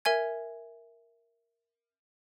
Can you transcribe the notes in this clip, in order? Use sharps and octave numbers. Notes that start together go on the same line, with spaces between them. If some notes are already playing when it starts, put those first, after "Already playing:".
A#4 E5 G#5 G#6